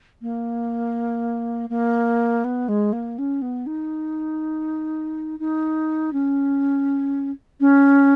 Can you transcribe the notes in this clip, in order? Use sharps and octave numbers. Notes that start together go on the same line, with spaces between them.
A#3
A#3
B3
G#3
A#3
C#4
B3
D#4
D#4
C#4
C#4